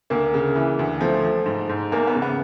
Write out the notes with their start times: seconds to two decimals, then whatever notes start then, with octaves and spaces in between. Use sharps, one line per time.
0.10 D2 A#3
0.34 C#3
0.56 E3
0.79 D2
1.01 F3 A3
1.23 F3
1.46 G#2
1.69 G#2
1.92 E2 A#3
2.07 B3
2.15 C#3
2.22 B3